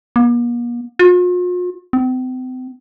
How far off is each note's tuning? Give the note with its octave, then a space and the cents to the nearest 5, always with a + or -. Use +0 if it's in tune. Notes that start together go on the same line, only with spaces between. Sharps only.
A#3 +45
F4 +45
C4 -40